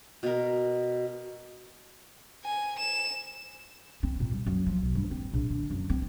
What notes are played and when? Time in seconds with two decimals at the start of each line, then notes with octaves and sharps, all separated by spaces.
0.23 B2 A#4
2.44 G#5
2.79 E7
4.03 C4
4.20 A#2
4.32 G3
4.46 F#2
4.66 F3
4.82 B1
4.95 G2
5.11 C4
5.33 A#1
5.50 D3
5.70 F#2
5.90 C4